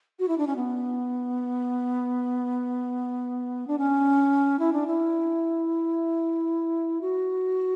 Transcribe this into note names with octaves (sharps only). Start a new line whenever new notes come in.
F#4
E4
D4
C#4
B3
D4
C#4
E4
D4
E4
F#4